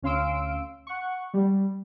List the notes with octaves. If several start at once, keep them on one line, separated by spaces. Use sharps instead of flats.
D2 C#4 F5 C6 E6 D7
F#5 C#6
G3